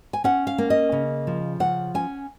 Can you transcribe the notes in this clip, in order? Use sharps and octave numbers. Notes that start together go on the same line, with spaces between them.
G#5
C#4 F#5
F5
A#3
D#5
C#3
F3
C#3 F#5
C#4 G#5